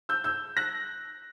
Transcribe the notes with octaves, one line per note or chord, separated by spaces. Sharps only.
E6 G6
E6 G6
F#6 A#6